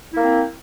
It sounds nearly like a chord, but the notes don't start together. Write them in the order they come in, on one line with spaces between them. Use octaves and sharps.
E4 A#3 C4